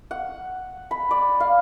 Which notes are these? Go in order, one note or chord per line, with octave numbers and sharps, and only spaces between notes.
F#5
B5
D5
F5